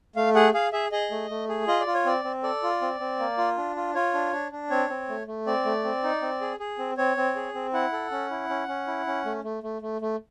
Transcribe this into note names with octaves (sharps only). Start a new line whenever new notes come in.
A3 F5
G#4 F#5
G#4 F5
G#4 E5
G#4 D#5
A3
A3
G#4
F4 D#5
D5
F4
C#5
C4 D5
C4
A4 D5
F4
C4
C4
A#3
F4
D4
F4
F4 C#5
D4
D4
D4
C4 C#5
C4
A3
A3
C4 D5
A3
C4
D#4
C4
G#4
G#4
C4
C4 C#5
C4
G#4
C4
E4 F#5
A4
C#4
E4
C#4
C#4
E4
C#4
A3
A3
A3
A3
A3